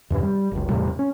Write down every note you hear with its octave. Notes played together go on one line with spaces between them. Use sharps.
E2 G2 C3 E3
G3
F#1 C#2
E2 A2 C3 G3
C#4